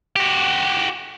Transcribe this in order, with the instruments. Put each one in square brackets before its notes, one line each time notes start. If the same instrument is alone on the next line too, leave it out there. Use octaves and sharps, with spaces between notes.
[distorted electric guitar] F#4 G4